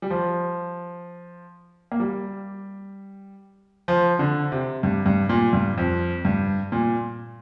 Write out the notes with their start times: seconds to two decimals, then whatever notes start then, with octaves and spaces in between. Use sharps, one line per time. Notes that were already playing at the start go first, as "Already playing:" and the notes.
0.02 G3
0.10 F3
1.92 A#3
2.00 G3
3.88 F3
4.19 D3
4.52 C3
4.83 G2
5.06 G2
5.29 A#2
5.53 G2
5.78 F2
6.25 G2
6.72 A#2